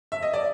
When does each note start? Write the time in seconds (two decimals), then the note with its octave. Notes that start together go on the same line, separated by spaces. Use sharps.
0.12 E5
0.23 D#5
0.34 D5